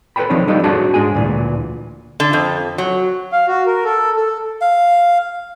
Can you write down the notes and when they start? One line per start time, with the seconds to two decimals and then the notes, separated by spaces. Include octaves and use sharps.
0.16 A4 B4 C5 F5 G5 B5
0.30 F3 C4 D4 D#4 C#5
0.47 G3 B3 D#4 G4 A4 F5
0.64 D4 F#4 G#4 C#5 A5
0.94 G#2 G#3 G#4 G#5
1.15 D2 A#2 E3
2.20 D3
2.33 F2
2.78 F#3
3.33 F5
3.47 F#4
3.66 A#4
3.84 A4
4.16 A4
4.61 F5